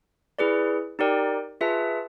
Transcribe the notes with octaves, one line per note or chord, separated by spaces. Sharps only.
E4 G#4 B4 D5
D#4 G4 A#4 D5 G5
F4 G#4 B4 E5 A5